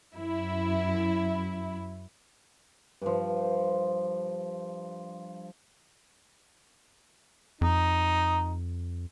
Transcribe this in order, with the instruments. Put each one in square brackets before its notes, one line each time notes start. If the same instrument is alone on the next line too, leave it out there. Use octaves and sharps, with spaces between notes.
[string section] F#2 E4
[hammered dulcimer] G2 F3
[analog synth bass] F2 [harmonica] D#4